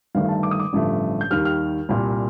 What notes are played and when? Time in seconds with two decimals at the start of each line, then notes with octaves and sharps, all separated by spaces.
0.15 G1 G2 D#3 A3 F5
0.29 A5
0.43 D6
0.51 D#6
0.60 D6
0.73 A1 G2 D3 F3 A3
1.21 G6
1.30 D#2 D#3 G3 F6
1.45 F6
1.89 C2 A#2 G3